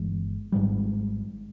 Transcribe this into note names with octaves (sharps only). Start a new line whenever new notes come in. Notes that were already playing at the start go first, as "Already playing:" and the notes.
Already playing: G1 G2 E3 G#3
G#1 G#2 D#3 G3